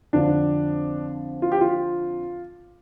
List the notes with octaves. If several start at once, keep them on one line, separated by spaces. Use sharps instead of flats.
F2 D3 F3 D4
F4
G4
F4